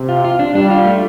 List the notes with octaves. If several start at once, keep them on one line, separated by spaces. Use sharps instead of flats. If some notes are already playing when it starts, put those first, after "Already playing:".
Already playing: C3
F4
F4
D4
G3 D4
F4
A3